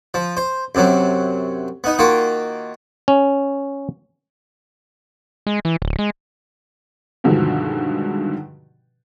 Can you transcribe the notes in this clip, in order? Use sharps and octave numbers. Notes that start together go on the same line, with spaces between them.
F3
C5
F#2 C3 F#3
B3 D#4
D#3 A#3 F4 F#4
C#4
G#3
E3
D1
G#3
G2 B2 D3 D#3 F3 G#3